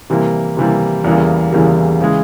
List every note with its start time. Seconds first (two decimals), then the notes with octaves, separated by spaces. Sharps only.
0.10 C3 E3 G3 A#3
0.57 C3 E3 G3 A#3
1.04 E2 C#3 E3 G3 A#3
1.53 E2 C#3 E3 G3 A#3
2.01 C#3 E3 G#3